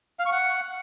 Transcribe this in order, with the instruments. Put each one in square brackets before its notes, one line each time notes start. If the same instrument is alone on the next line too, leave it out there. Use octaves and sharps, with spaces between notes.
[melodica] F5
C#6
F#5